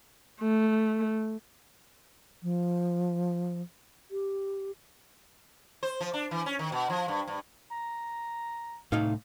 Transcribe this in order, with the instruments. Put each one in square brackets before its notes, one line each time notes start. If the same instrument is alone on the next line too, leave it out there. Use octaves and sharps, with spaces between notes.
[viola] A3
[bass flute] F3
G4
[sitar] C5
F3
D4
E3
C#4
D#3
B2
F3
G2
G2
[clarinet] A#5
[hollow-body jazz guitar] C2 D#4 F5 [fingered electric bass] A2